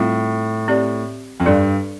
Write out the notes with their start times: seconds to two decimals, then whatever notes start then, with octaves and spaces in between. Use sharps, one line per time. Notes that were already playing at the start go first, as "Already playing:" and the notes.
Already playing: A2 G3 C4 F4
0.68 C4 G4 D5
1.40 F2
1.46 G2 G3 D4 A4 D5